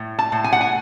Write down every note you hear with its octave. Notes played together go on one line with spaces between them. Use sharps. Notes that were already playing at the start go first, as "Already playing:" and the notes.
Already playing: A2
A5
A2
G#5
F#5
G#5